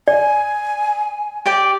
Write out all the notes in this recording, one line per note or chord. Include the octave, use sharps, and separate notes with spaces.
D5 G#5
G4 D5 G5